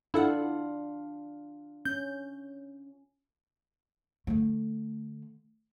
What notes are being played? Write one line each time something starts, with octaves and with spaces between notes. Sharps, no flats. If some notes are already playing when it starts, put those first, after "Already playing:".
D4 E4 F4 A4 F5 F#5
C#4 G6
D3 A3